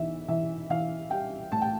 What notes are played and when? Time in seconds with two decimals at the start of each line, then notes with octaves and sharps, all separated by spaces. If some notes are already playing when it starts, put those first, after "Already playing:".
Already playing: B1 E3 E5
0.28 E3 E5
0.70 E3 F5
1.10 G3 G5
1.52 A2 A5
1.62 G5